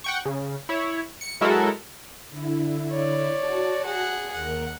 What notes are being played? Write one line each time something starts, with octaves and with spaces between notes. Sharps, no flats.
F#5 G5 C#6
C#3
E4 C#5
C#7
F#3 G#3 E4 F#4 A4 A#4
D3 E4
C#5 D5
F#4 A5
G#4 F#5
D#2 A#4 F#5